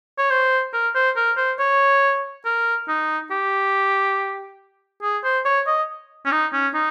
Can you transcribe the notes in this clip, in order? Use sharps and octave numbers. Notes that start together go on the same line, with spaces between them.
C#5
C5
A#4
C5
A#4
C5
C#5
A#4
D#4
G4
G#4
C5
C#5
D#5
C#4
D#4
C#4
D#4